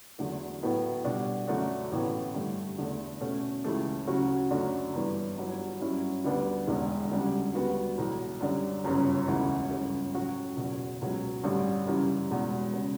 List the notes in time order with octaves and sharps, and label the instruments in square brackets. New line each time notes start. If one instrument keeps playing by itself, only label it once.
[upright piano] E2 D3 F#3 A3
A2 F#3 B3 E4
B2 G3 D4 F#4
F#2 D3 A3 D4 F#4
A1 A2 E3 B3
G2 D3 A3
E2 D3 A3
B2 A3 C#4
C#2 C#3 E3 A3
D2 C#3 F#3 C#4 F#4
F#2 D3 A3 D4 F#4
G2 E3 B3 D4
G1 G2 F#3
G2 F#3 C#4 E4
D2 D3 G3 B3 D4
E1 E2 D3
D2 C#3 G3 D4
D2 D3 G3 B3 F#4
B1 A2 E3
F#2 D3 G3 D4
G1 F#2 C#3
E1 D2 C#3 E3 A3
G1 F#2 C#3
A2 F#3 C#4 F#4
F#1 E2 B2
C#2 B2 F#3
A1 G2 D3 G3
F#2 C#3 E3 G3
E1 E2 B2
C#3